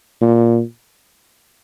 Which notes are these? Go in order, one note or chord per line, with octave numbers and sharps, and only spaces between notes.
A#2